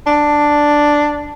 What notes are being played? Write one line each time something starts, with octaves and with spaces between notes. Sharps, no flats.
D4